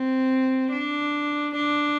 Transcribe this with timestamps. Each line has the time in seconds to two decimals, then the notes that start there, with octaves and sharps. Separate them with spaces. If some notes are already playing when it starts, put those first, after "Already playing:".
Already playing: C4
0.71 D4
1.55 D4